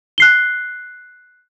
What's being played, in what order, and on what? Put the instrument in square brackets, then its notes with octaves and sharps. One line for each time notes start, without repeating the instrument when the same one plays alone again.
[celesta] F#6 C7 G7